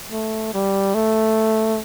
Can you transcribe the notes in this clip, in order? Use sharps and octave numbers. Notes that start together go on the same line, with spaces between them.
A3
G3
A3